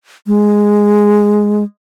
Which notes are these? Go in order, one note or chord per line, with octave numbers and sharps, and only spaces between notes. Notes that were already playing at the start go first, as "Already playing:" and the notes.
G#3